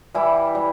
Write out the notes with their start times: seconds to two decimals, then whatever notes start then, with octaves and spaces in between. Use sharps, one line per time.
0.14 E3 G3 E4
0.55 G3